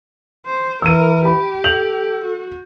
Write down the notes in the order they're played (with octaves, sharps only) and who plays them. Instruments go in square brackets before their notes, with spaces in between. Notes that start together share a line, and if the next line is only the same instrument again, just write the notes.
[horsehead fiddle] C5
[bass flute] E3 [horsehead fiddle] A#4 [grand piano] E6 D#7
[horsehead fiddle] G4 [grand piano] B5
[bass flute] A4 [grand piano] G6 F7 F#7
[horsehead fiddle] F#4